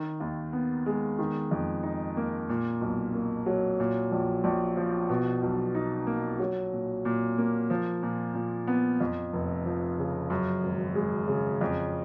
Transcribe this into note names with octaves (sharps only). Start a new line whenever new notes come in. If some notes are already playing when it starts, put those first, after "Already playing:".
Already playing: D#3
D#2
B3
G#3
D#3
F2
D#4
A#3
A#2
B1
A#3
F#3
A#2
A#1
A#1
F3
B2
B1
D#4
A#3
F#3
A#2
A#2
A#3
F3
A#2
A#2
B3
F2
F1
F3
C#3
F#2
G#1
G#3
C#3
F2